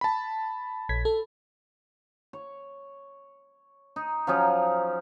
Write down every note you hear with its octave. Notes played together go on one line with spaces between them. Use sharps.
A5 B5
A#1 G#6 B6
A4
C#5
D#4
F3 F#3 C#4 D#4